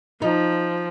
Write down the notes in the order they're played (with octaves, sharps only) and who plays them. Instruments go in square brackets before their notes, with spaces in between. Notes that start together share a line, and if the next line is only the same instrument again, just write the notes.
[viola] F3 [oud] D#4